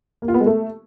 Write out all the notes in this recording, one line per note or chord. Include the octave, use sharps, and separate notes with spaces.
A#3
F4
B3
G#3
A3